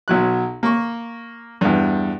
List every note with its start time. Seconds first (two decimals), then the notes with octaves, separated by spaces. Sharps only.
0.08 B1 F#3 F#6
0.63 A#3 C#6
1.61 E2 G2